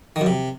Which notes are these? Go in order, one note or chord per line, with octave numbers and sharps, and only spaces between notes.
D#3
F#2
C3